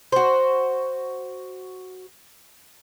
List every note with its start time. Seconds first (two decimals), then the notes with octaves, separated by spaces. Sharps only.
0.12 F#4 C5